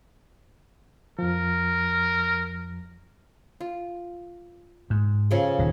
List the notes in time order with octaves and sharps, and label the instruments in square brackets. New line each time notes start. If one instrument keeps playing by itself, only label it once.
[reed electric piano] F2 F3 [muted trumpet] A#4
[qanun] F4
[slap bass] G#2
[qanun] C#3 F3 A4
[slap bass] D#1 D#3